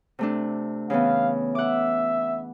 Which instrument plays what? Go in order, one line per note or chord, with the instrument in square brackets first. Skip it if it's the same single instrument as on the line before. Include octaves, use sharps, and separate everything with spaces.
[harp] C3 A3 D4
[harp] C#3 E3 B3 [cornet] F5
[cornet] E5 [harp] F#5 D6